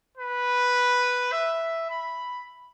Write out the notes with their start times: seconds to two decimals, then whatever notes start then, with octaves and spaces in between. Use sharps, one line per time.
0.17 B4
1.32 E5
1.90 B5